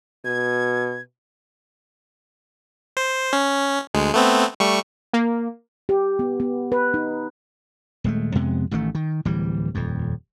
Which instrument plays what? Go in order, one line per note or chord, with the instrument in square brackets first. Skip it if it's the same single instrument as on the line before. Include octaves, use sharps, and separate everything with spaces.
[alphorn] B2 [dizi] G#6
[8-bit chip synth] C5
C#4
D2 G#3
A3 B3 C4
G3 A3 C#6
[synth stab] A#3
[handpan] G4
B3
B3
B4
D#4
[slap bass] D#1 G#3 A3
F2 C3 G#3 B3
A1 D#3 F#3 A3
D#3
D1 E3 G3
D#1 F2